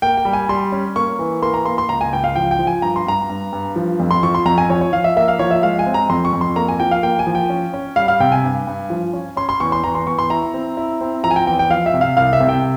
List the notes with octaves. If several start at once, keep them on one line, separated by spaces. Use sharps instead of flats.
A#3 G5
G5
G3
G#5
G3 C6
C#4
A#3 C#6
E3
A#3 C6
A#5
A#3 C6
C6
C#2 A#5
G#5
C#2 G5
F5
F3 G5
G5
F3
G#5
G2 A#5
C6
G2 A#5
G2
G2
F3
F2
C6
F3 C#6
C6
F2 A#5
G#5
F3 C#5
C#5
F3 F5
E5
A#3 E5
F5
F3 C#5
E5
G#3 F5
G#5
C4
A#5
F2 C6
C#6
F2
C6
A#3 A#5
G#5
F3 G5
F5
A#3 G5
G#5
F3
G5
C#4
C#4
G3 F5
F5
C3 G5
G#5
G2
G2
F3
C#4
C#4 C6
C6
E2 C#6
C6
E2 A#5
C6
E2 C#6
C6
E4 A#5
C4
E4
C4
F3 A#5
G#5
G5
E2 G5
G5
F3 F5
E5
C3
F5
C2 F5
E5
C3
G5